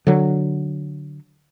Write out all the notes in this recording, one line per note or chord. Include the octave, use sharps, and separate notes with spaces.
D3 F#3